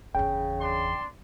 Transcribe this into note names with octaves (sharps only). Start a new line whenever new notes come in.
G1 E2 C#3 G5
D4 C6